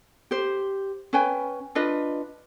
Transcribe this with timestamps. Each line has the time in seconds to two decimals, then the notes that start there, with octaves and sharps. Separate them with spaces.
0.31 G4 C5
1.13 C#4 B4 G5 G#5
1.75 D4 F4 B4 D#5